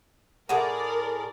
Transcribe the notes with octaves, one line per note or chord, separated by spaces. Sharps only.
A2 G#4 A#4 D5 E5 F#5